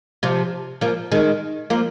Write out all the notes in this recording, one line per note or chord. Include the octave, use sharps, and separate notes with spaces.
C3 F3
F3 A#3
D#3 G#3
F3 A#3